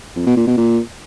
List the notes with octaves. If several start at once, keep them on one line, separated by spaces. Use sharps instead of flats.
F2
B2
A#2
B2
A#2